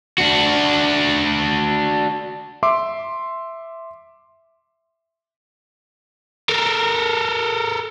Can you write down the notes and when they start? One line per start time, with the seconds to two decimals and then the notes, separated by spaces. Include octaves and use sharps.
0.18 D4 F#4
2.63 E5 C6 D6
6.49 A4 A#4